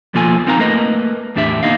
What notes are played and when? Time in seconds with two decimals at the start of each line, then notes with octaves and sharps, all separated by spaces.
0.14 B2 F3 A#3 F4 A4 G#5
0.47 C4 D#4 A#4 F5 A5 A#5
0.59 A3 A#3 A#4 B4 D#5
1.36 E2 A2 D4 G4 E5
1.63 A#3 B3 C#4 D#4 D#5 F5